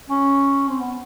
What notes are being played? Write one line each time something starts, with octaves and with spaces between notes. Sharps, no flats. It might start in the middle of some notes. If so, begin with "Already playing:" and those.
C#4
C4
B3